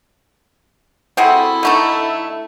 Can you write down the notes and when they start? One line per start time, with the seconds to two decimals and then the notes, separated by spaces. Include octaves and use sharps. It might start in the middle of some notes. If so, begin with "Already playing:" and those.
1.17 C4 E4 F#4 G#4 A4
1.63 D3 A3 D#4